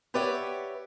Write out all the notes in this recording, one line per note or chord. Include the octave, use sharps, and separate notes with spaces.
G4 B4 C#5 D5 E5 F#5